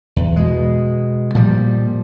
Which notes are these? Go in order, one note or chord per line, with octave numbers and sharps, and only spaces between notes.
E2
B2 G#3
A#2 F3 G3